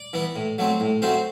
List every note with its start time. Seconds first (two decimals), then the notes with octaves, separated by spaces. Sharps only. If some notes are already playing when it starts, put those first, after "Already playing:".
Already playing: D5
0.13 E3 B3
0.36 A2
0.58 F#3 A3 C4
0.80 A2
1.02 F#3 A3 C4 C5